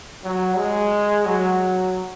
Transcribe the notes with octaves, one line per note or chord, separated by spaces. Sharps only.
F#3
G#3
F#3